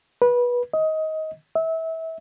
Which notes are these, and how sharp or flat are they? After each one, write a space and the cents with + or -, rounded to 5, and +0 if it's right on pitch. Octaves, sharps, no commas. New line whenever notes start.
B4 -20
D#5 +20
E5 -25